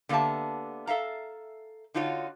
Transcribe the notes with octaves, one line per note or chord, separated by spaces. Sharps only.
D3 A#3 B3 G4 E5 A5
A4 E5 F5 A#5
D3 D#4 F4 F#4 C#5